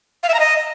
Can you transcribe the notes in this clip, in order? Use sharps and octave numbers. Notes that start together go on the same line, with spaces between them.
F5
E5
A#5
D#5